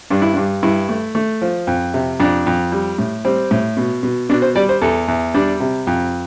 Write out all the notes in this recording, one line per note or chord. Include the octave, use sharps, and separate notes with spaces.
G2 D4
E4
G2 D4
G2 E4
A3
A3
F3
F2
C3
F2 D4
F2
G3
A2
G3 C4
A2
B2
B2
B2 D4
C5
G3 D5
C5
E2 A4
E2
G3 D4
C3
F2